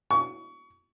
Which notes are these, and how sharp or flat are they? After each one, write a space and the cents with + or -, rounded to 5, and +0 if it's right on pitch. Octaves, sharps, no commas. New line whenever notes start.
C#6 +25